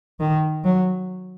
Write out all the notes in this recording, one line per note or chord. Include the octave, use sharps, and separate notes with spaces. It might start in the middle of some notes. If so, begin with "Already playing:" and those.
D#3
F#3